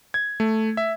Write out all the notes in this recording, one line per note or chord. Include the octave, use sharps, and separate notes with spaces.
G#6
A3
E5